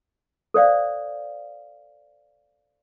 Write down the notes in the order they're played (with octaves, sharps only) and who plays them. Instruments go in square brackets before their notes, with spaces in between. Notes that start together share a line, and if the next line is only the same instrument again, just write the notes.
[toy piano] A4 C5 D5 F5